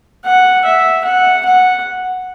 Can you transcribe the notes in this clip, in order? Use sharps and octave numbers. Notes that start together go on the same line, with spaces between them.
F#5
E5
F#5
F#5